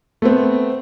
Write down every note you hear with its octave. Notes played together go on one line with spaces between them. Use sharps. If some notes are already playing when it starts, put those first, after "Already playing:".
A3 B3 C4